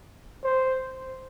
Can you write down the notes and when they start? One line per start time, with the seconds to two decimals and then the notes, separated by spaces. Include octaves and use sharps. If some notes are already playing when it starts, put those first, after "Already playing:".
0.44 C5